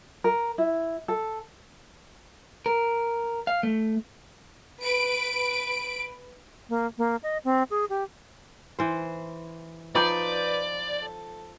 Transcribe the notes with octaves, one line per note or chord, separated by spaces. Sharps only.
A#4
E4
A4
A#4
F5
A3
B4 D7
A#3
A#3
D#5
C4
G#4
G4
E3 C5
F3 D#4 B4 D5 B5 D6 G6
A4